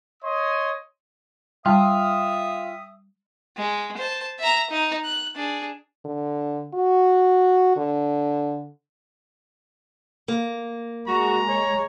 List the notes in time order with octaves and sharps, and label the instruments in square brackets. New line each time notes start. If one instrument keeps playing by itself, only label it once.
[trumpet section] C#5 D#5 C6 D#6
[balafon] G3 A5 [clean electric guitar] F4 [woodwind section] E5 D#6 [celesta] G5
[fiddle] G#3
C5 A5
E5 A#5
D#4
F#6
D4 G#4
[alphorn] D3
F#4
D3
[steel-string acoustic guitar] A#3
[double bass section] G#3 [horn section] F#4 [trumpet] A#5
[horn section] C#5